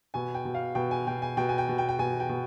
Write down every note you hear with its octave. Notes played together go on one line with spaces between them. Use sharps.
B2 G#5
G5
B2
F5
B2 G5
G#5
B2 G5
G#5
B2 G5
G#5
G5
B2
G5
G5
B2 G#5
G5
B2